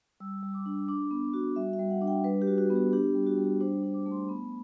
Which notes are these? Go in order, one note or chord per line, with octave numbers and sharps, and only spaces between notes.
G3 E6
G3
D6
D4
D4 D6
B3
F#4
G3 E5
E5
G3
F#5
D4
G5
G3 B4
G4
F#4
F#4
B3
G4
D4 G4
G3
F#4
G3
G4
D4 C5
D4
D6
A3
C6
B3 B5